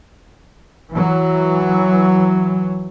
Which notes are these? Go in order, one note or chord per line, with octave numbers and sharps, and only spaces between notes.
E3 F#3